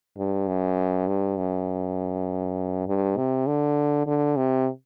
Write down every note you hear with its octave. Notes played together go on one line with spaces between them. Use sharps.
G2
F#2
G2
F#2
G2
C3
D3
D3
C3